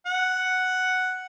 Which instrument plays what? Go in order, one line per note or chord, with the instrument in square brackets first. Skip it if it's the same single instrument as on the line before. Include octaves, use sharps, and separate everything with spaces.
[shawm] F#5